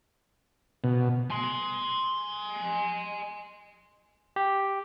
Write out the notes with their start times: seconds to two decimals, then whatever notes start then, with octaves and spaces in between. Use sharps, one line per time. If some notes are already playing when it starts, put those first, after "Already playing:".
0.84 B2
1.30 G#5 C6
4.36 G4